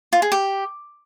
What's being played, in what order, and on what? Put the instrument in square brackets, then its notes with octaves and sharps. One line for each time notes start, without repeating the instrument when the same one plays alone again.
[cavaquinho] F4
G#4
G4